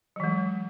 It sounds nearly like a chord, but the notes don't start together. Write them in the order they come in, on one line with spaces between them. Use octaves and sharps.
F#3 E3 G#3